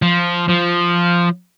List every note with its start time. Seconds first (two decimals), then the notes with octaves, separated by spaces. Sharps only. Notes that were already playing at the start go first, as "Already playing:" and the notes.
0.02 F3
0.49 F3